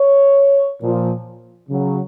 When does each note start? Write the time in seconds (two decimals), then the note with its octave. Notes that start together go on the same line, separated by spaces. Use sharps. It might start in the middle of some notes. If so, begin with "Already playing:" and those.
Already playing: C#5
0.80 A#2 F3
1.69 C#3 F#3